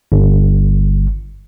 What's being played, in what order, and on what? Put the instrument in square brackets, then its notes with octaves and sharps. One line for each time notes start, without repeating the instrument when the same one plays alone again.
[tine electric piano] G1